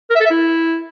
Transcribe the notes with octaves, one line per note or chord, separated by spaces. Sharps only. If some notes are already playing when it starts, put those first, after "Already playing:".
A#4
E5
A4
E5
E4